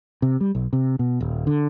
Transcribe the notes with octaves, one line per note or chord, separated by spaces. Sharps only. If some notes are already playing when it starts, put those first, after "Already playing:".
C3
G3
B1
C3
B2
D#1
D3